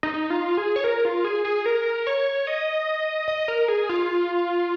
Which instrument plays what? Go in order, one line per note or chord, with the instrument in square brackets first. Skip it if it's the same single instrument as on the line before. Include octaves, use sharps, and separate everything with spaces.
[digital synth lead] D#4
F4
G#4
C#5
A#4
F4
G#4
G#4
A#4
C#5
D#5
D#5
A#4
G#4
F4